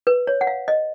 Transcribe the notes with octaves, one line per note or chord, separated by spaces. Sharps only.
B4
C#5
F#5
F5
D#5